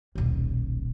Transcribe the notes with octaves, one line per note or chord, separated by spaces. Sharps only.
D#1 B1